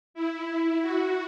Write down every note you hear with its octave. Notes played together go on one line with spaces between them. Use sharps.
E4
F#4